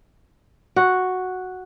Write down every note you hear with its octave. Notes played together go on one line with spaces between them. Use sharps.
F#4